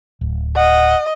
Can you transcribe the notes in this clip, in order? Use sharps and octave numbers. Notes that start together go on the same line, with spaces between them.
D1
D#5 F#5